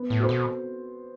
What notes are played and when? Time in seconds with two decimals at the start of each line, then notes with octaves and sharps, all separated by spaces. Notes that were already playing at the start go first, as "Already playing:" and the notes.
Already playing: B3
0.10 A2
0.20 F#4 A4 C5
0.29 B2